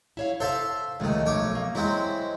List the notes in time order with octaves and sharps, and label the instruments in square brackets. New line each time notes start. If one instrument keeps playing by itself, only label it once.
[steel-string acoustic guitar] E4 C#5 F5
[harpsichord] A4 E5 F5 [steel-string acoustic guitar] C5
[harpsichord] C#2 D#3 [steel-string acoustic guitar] F3 A3
[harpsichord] B1 C#5 D6
[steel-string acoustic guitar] A#3
[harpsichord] F#3 G#3 C4 [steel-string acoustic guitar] E4